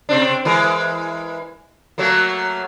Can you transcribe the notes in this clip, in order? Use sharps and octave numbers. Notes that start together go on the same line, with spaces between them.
C3 C4 D4
E3 G#3 A#4
F#3 A3 A#3